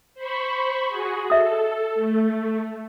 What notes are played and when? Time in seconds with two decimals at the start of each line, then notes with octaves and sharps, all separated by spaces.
0.14 C5 B5 C#6
0.87 F#4 G#4
1.30 A4 D#5 E5 D#6
1.94 A3